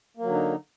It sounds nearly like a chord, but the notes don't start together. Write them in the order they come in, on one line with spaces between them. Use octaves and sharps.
A#3 F#3 D3 D#4